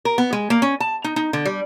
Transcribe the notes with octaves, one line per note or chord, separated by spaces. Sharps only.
A#4
B3
G#3
A#3
C#4
A5
D#4
D#4
D3
G3